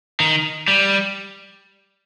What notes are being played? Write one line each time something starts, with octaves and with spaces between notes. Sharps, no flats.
D#3
G3